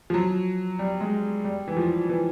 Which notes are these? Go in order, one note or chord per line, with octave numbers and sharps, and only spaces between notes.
F3
F#3
G3
G#3
G3
E3
F3
E3